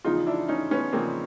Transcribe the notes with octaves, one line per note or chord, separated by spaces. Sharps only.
E2 C#3 F3 D#4 F4
D4 E4
C#4 D#4
B3 C#4
E2 C#3 F3 A#3 C4